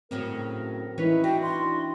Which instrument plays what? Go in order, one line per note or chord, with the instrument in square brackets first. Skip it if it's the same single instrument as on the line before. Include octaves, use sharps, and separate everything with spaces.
[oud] A2 C#3 F#3 [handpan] C4 [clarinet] A#4
[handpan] E3 D#4 E4 [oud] C#4 [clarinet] B4
[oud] D4 [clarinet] F#4 [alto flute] G5
[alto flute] C6